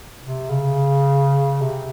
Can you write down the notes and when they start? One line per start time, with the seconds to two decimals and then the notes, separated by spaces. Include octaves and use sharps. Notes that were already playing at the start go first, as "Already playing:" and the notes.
0.22 C3
0.50 C#3
1.61 C3